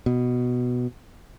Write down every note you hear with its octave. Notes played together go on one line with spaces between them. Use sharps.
B2